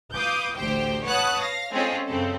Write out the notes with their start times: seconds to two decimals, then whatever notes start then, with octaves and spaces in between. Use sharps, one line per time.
0.13 B4 F5 D6 D#6 G6
0.56 A1 D2 G4 C5 G5
1.04 B4 C#5 F#5 A5 D#6 F#6
1.41 F5 A#6
1.72 G#3 C4 C#4 F4 G#4 A4
2.07 F#2 C#3 C4 A4